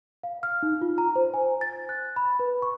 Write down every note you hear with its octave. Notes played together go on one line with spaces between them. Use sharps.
F5
F6
D#4
F4
A#5
C5
G#5
A6
F#6
B5
B4
C#6